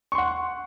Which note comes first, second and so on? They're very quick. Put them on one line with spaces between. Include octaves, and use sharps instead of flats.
C#6 C6 F#5